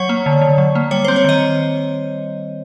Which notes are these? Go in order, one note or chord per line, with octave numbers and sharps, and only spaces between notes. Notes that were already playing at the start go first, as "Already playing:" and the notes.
Already playing: F#3 C#5
A#3
D3
D3
F#3
A#3
G3 C#5
C4 C5
C#5
D#3 D#5